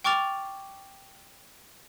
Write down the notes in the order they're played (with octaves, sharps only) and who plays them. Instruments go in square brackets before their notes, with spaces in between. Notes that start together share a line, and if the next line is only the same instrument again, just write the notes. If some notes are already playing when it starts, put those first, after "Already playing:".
[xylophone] G5 C#6 D6 F6 A6 F7